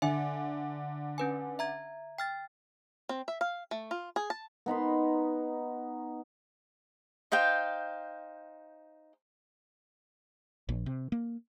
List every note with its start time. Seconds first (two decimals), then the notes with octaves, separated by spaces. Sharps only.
0.02 D3 E5 G#5
1.18 C#4 B4 G#5
1.59 E5 A#5 G#6
2.18 G5 F6 A6
3.09 C4
3.28 E5
3.41 F5
3.71 A3
3.91 F4
4.16 G#4
4.30 A5
4.66 B3 D#4 B5 C6
7.32 D#4 C5 F5 G5
10.69 A#1
10.86 C3
11.12 A#3